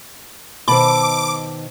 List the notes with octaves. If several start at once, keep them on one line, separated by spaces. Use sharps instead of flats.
B2 D#3 C5 A5 B5 D6 E6